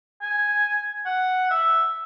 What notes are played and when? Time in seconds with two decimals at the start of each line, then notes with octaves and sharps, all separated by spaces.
0.22 G#5
1.06 F#5
1.51 E5